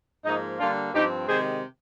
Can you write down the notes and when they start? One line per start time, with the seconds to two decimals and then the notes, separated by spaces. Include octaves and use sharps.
0.25 G#2 F3 A#3 D#4
0.59 D3 G3 A#3 D4 F4
0.94 G2 F3 C4 D#4 G4
1.28 C3 D#3 G#3 G#4 C5